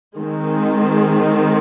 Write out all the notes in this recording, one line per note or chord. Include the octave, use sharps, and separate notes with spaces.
D#3 G#3 C4